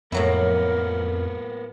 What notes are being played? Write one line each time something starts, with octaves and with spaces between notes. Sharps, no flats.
F2 A2 F#3 A#3 B3 E4 A#4